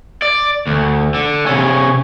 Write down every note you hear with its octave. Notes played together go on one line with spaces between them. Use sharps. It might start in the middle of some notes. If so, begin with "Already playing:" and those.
D5
D2
D3
C3 C#4